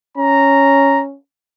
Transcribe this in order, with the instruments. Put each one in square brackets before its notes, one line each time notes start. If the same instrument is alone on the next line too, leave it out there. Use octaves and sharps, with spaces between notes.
[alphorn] C#4 [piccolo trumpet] A#5